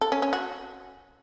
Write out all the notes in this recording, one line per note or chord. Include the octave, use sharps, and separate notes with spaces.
A4
C#4
C#4
F#4